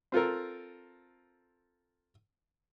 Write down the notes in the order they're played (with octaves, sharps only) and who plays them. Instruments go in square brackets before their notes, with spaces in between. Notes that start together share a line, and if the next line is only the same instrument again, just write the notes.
[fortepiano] C4 F4 A4 A#4